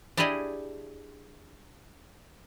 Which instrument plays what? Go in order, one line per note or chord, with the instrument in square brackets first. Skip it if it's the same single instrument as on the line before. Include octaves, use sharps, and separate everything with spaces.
[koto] D4 E4 G4 G#4 D5 D#5